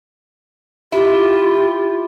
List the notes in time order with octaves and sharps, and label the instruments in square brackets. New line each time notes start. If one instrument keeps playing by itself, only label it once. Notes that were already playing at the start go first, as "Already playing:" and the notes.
[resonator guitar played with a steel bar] E4 [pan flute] F4 [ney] G4